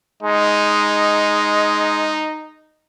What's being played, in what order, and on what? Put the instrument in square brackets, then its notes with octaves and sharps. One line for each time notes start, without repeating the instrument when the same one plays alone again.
[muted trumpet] G#3 [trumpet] D#4